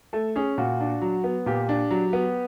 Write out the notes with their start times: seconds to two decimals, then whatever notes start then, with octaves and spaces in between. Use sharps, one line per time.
0.13 A3 A4
0.36 C#4 G#4
0.58 A#2 F#4
0.81 D4
1.02 F#3
1.24 B3
1.46 A#2 G4
1.69 D4
1.91 F#3
2.13 B3